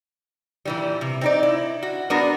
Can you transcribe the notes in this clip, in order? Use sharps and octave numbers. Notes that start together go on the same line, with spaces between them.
A#2 E3 G3
C3
C4 D#4 D5
E4
F#4
G3 B3 D4 F#4 A#4